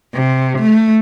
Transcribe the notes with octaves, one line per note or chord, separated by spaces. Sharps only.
C3
A3